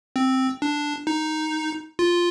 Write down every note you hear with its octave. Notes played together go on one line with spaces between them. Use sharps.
C4
D4
D#4
F4